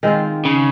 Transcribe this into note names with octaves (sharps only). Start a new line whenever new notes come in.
D#3 G#3 C4 F4
C#3